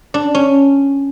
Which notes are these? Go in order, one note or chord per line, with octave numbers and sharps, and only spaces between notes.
D4
C#4